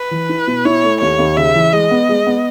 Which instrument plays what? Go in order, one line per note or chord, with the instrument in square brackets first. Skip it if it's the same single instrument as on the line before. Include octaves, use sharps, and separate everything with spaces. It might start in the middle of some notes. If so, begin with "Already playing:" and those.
Already playing: [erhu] B4
[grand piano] E3
E4
B2
[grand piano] E4 [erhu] C#5
[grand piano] A3
[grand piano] D#2 [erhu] C#5
[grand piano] D#2
[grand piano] C#3 [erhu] E5
[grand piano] E3
[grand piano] G#3 [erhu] D#5
[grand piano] B3
G#3
B3